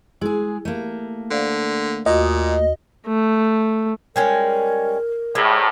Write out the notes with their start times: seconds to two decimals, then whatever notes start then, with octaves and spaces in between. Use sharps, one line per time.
0.21 G#3 E4 G#4
0.65 A3 A#3 G4
1.31 D3 C5 D5 F5
2.06 D#2 A#2 F#4 D#5
3.07 A3
4.16 G3 G#3 C#4 A#4
5.35 C2 A2 G#3